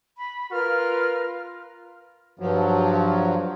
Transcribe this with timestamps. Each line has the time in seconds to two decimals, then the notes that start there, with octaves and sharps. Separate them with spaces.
0.18 B5
0.51 F4 A#4 B4 F6
2.39 G2 F3 F#3